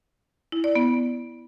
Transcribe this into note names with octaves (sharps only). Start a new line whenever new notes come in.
E4
D5
B3